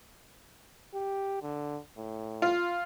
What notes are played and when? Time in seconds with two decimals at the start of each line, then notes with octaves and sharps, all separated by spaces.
0.94 G4
1.42 D3
1.97 A2
2.42 F4